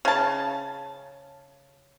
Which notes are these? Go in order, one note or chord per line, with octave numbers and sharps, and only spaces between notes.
C#3 A5